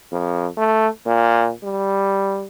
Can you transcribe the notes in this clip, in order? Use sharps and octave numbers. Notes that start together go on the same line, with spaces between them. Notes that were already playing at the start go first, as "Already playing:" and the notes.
F2
A3
A#2
G3